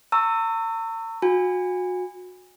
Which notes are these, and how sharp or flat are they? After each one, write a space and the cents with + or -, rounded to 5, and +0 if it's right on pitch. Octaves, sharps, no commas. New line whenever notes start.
A#5 -45 C#6 +0 E6 +0
F#4 -30 G#5 -25